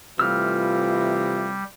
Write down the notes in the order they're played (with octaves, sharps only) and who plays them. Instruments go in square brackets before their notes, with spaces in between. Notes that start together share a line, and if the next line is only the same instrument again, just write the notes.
[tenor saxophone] C3 [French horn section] E3 A3 F4 [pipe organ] G3 [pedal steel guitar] E6 F6